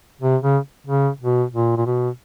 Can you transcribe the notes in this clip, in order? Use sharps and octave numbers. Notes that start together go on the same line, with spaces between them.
C3
C#3
C#3
B2
A#2
A#2
B2